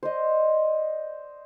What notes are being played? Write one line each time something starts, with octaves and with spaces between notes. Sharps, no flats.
C5 D5 D#5